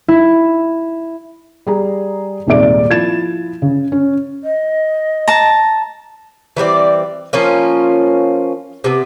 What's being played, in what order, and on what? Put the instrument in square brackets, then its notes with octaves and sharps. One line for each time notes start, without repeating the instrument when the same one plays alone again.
[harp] E4
[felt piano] G3 G#4 A#5
D#1 G#2 C3 G#4 D5 D7
F3 E4 G#6 A6 E7
C#3
C#4
[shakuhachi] D#5
[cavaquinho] A5 A#5
[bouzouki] E3 G3 C4 D5
F3 A#3 C#4 F4
C3 B3